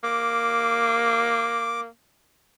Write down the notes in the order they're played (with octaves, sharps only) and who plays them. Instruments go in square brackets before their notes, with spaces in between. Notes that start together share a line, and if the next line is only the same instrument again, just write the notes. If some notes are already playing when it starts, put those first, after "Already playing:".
[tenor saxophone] A#3 [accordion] D6